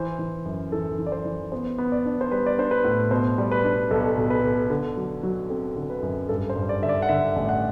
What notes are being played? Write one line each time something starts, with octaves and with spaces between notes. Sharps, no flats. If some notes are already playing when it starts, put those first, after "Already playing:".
Already playing: E3 C5
E3
F#2
E3 A4
E3
D5
C5
E3
B3 C5
B3
D5
D4
C5
G3 B4
D5
D4 C5
B4
A2
B2 C5
G3
B4
D4
B1 A4
B2
B4
B2
D3
F#3
F#3
C4 A4
D3
B4
F#2
G2 A4
C5
G2
D5
D3 E5
D5
F#5
D3 E5
A1
F#5